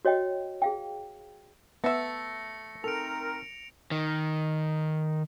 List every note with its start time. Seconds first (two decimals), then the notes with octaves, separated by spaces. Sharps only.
0.05 F#4 C#5 D#5 G5
0.62 G#4 F5 G5
1.84 A3 B3 E5 A#6 C#7
2.84 C4 D#4 A4 A#4 D7 F7
3.91 D#3